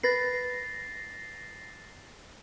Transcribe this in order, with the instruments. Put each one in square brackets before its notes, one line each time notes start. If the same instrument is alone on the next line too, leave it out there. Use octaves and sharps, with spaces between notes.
[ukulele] B4 [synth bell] A6 A#6 C7